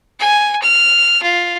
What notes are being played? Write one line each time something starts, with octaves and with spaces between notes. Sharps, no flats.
G#5
F6
F4